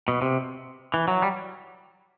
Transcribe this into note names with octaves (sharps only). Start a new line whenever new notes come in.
B2
C3
E3
F#3
G3